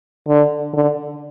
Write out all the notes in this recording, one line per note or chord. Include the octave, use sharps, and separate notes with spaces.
D3
D3